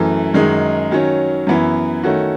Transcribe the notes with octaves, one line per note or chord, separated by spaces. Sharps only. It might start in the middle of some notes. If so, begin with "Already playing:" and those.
Already playing: F#2 E3 A3
F#2 D#3 G#3 D#4
D#3 F#3 C#4
F#2 E3 B3 E4
D#3 A3 C#4 F#4